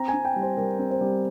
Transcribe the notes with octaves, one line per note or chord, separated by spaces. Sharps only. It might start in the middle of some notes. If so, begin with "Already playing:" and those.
Already playing: C4 A#5
G#5
C4
G5
G3
C5
G3 A#4
C4
C5
G3